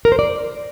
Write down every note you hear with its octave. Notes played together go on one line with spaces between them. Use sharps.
A#4
C5
D5